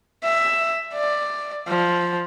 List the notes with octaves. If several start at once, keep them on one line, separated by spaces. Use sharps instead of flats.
E5
D5
F3